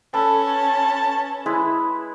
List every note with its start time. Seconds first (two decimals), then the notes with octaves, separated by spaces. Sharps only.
0.14 C#4 A4 B4 A5
1.46 G#3 E4 B4